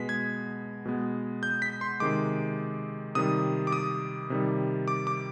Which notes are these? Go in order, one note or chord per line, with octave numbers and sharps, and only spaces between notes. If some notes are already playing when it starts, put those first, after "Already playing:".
Already playing: B2 G#3 B3 B6
G#6
B2 G#3 B3
G6
B6
C6
C3 D#3 G#3 D6
C3 D#3 G3 D#6
D6
D#6
C3 D#3 G3
D6
D6